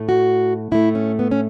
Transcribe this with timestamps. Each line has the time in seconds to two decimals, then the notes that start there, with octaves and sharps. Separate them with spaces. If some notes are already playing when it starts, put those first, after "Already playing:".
Already playing: A2 A3
0.09 F#4
0.72 A2 A3 E4
0.95 C#4
1.19 B3
1.31 C#4